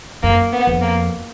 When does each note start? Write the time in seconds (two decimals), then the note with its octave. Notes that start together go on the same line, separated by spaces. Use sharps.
0.23 F#2 A#3
0.52 B3
0.67 F2
0.81 A#3